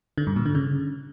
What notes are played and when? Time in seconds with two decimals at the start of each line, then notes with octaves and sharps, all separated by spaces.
0.18 D3
0.27 G2
0.36 A#2
0.46 D3
0.55 C#3